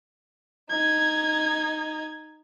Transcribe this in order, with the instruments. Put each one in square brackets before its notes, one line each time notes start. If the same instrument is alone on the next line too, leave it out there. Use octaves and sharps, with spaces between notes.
[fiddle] D#4 [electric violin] G#6